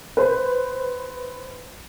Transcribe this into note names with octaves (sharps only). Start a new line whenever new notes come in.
B4 C5